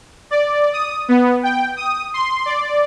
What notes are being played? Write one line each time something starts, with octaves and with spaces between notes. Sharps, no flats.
D5
D#6
B3
G5
D#6
C6
D5